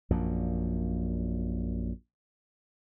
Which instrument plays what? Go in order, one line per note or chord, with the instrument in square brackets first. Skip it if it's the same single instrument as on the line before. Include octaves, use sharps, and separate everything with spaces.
[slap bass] A#1 F#2 A#2